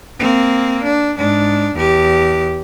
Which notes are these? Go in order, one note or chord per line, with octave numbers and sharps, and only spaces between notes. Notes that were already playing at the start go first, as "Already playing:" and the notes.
A#3 C4
D4
G#2 D4
E2 G4